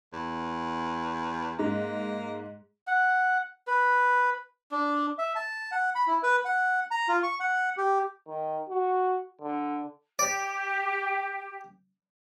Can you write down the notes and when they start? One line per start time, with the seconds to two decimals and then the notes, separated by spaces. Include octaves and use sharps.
0.13 E2
1.59 G#2 A#3
2.87 F#5
3.67 B4
4.71 D4
5.19 E5
5.35 A5
5.72 F#5
5.95 B5
6.07 E4
6.23 B4
6.45 F#5
6.91 A#5
7.08 F4
7.23 C#6
7.40 F#5
7.77 G4
8.28 D#3
8.70 F#4
9.41 D3
10.19 G4 D5